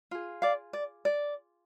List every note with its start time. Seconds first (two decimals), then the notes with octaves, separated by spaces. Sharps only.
0.11 F4 G#4
0.42 D5 F5
0.73 D5
1.05 D5